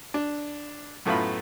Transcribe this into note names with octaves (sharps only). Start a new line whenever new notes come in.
D4
F#2 A2 A3 B3 F4 B5